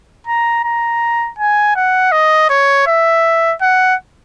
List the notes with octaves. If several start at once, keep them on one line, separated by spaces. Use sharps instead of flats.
A#5
A#5
G#5
F#5
D#5
C#5
E5
F#5